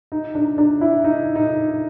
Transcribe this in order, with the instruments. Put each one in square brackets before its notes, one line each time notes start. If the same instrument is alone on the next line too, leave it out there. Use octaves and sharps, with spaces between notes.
[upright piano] D#4
D4
D4
E4
D#4
D#4